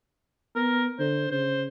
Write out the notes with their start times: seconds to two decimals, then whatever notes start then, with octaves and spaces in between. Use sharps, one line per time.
0.56 B3 A#4
0.99 D3 C5
1.31 C#3 C5